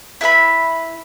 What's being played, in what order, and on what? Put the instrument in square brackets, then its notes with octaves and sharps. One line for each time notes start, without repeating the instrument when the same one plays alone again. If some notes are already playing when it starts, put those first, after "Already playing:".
[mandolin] E4 B4 E5 B5